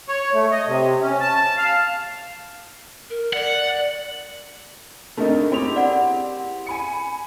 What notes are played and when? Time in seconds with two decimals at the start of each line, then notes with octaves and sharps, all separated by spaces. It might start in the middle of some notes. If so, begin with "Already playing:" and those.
0.08 C#5
0.34 A3
0.52 D#5
0.67 C3
1.01 C#4
1.20 A5
1.57 F5
3.10 A#4
3.33 D5 F#5
5.17 A3 C4 D4 D#4 A#4
5.52 C4 E4 G4 G#4 F7
5.76 D5 F#5
6.67 G#5 B5 C#7